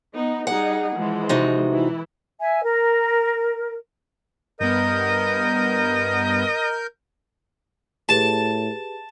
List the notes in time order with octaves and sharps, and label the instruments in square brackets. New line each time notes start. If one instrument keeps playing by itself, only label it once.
[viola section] B3 D#4
[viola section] G3 D#4 G#4 [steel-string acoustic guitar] F#5
[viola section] E3 F3 G#3
[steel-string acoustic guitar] C3 D#4 F#4
[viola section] E3 E4
[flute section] E5 G#5
A#4
[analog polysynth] G2 B3 [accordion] A#4 G6 [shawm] D#5
[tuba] A2 [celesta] G4 G#4 B4 [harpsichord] A5